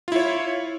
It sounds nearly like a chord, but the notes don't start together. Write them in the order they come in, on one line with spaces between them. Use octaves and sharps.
F4 E4 C#5